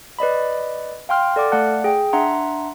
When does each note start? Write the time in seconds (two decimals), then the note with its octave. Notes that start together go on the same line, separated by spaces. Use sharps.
0.19 B4 D5 D#5 B5
1.09 F5 G5 C6 F6
1.36 A4 D5 F#5 D6 F6
1.52 A3 D5 F5 F#5 A5 F#6
1.84 G#4 G5
2.13 D4 E5 F#5 A#5 C6